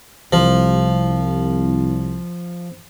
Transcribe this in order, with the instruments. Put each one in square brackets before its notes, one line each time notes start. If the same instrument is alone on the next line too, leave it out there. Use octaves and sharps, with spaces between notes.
[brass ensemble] C2 [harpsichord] F3